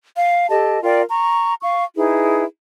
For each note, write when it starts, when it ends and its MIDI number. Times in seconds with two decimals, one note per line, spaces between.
0.15 0.46 77
0.49 0.81 67
0.49 0.81 69
0.49 0.81 75
0.49 0.81 81
0.83 1.02 65
0.83 1.02 70
0.83 1.02 74
0.83 1.02 79
1.09 1.53 82
1.09 1.53 85
1.63 1.83 77
1.63 1.83 85
1.96 2.43 63
1.96 2.43 64
1.96 2.43 68
1.96 2.43 71